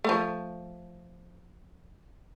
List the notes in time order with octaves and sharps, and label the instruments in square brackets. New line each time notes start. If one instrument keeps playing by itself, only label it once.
[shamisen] F3 A3